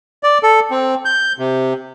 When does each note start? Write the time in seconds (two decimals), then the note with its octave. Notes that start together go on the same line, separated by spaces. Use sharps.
0.23 D5
0.43 A4
0.71 C4
1.05 G6
1.39 C3